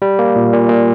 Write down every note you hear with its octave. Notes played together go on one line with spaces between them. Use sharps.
G3
A#3
A#2
A#2
A#2